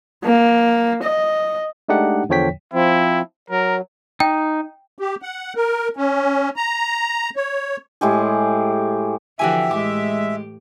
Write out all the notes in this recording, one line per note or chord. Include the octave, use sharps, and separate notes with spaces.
A#3
D#5
G#3 A3 D4 D#4 G4 F#5
E2 D3 F3 C#5 G5 B6
F3 C4 E4
F#3 A#4
D#4 G5
G4
F#5
A#4
C#4
A#5
C#5
A2 G#3 G4 G#4
D3 E3 F3 F#4 G4 E5 G#5
A2 G#3 G4 D6